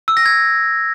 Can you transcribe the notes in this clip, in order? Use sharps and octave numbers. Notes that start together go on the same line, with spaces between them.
E6
A#6
G#6